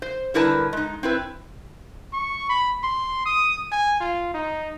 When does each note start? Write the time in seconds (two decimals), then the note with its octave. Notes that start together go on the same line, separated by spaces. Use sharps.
0.02 C5
0.34 D3 G3 E4 A#4 B4 A5
0.73 G#3 D#4
1.03 C4 E4 B4
2.13 C#6
2.49 B5
2.83 C6
3.26 D#6
3.72 G#5
4.00 F4
4.34 D#4